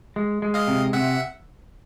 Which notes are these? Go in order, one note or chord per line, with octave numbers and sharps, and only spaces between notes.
G#3
G#3
D#5 F5
C3
C3 E5 F#5